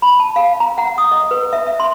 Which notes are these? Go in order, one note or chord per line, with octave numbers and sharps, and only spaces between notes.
B5
A5
F5
A#5
F#5
D#6
D#5
B4
E5
E5
C6